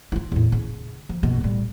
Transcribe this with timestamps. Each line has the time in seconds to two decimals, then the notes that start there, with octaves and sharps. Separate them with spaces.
0.12 D#4 F4
0.32 E2 A2
0.52 C#3
1.09 F3
1.23 F#1 B2
1.40 A2 G3